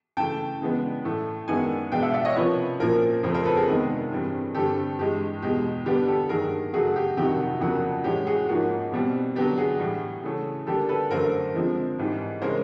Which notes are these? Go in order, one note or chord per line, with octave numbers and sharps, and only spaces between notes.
C#3 E3 A3 G5 A5
C#3 E3 G#3 B3 D4
A2 E3 A3
F#2 D#3 G#3 B3 D4 F#5 G#5
B2 G#3 B3 D4 F5 G5
E5 F#5
D5 E5
C#5 D#5
C3 F3 A#3 C#4 B4 C#5
A#2 F3 A#3 C#4 A#4 C5
F2 C#3 F3 A3 A#4 C5
A#4 C5
A4 B4
G#4 A#4
C3 D#3 G#3 B3 D4
G2 E3 G3 C4
G2 D3 G3 C4 G4 A4
G2 E3 G#3 G4
E2 B2 G#3 G4
D3 G3 B3 D4 G4
G4 A4
G2 D#3 F#3 A#3 G#4 A#4
F#2 C#3 F#3 A3 F#4 G#4
G4
F2 C3 D#3 F#3 G4
F#4
F#4
F2 C#3 F#3 A#3 D4 F#4
A2 E3 G#3 C#4 G4
F#4 G#4
G#2 F3 A#3 C#4 F#4
B2 G3 C4
D3 F#3 B3 D4 G4
F#4 G#4
A2 E3 G3
C#3 E3 A3 C#4
D3 G3 A#3 D4 G4 A4
A4 B4
F#2 D3 F#3 A3 A#4 C5
D3 F3 G#3 C4
G#2 E3 G3
C#3 E3 G#3 C#4 A#4 C5